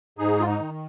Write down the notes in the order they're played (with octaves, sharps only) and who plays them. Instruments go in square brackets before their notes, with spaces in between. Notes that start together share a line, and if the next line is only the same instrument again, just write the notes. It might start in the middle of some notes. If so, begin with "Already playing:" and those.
[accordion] G#2 D#4 G#4
F4
D#4
D#3